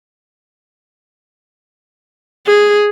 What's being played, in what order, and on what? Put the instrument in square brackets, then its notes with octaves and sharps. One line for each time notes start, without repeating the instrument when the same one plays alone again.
[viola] G#4